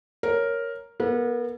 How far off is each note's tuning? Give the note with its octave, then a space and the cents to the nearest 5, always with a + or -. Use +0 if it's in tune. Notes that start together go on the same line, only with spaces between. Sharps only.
A#4 +0 C#5 +0
B3 -35 A4 +45